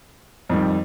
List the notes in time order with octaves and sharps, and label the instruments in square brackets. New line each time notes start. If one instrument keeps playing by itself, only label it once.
[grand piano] F2 D#3 G3